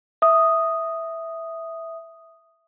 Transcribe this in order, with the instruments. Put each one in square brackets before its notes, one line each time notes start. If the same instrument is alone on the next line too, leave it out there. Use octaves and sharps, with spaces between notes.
[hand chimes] E5 D#6